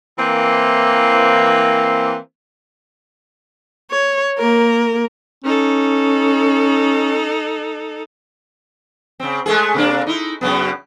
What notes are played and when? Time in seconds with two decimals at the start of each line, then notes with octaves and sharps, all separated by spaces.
0.18 E3 A#3 C4
3.91 C#5
4.38 A#3 A#4
5.44 C#4 D#4 A4
9.20 C#3 C4
9.46 G#3 A3 G#4
9.74 C3 A#3 D4
10.07 D#4 E4
10.41 F#2 C#3 B3